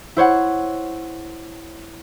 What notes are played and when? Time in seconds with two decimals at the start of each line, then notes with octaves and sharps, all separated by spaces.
0.16 E4 C5 C#5 F#5